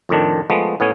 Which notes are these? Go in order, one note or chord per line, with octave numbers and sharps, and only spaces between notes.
F2 A2 D#3 D4
F3 G#3 A3 B3
A2 B3 C#4 G#5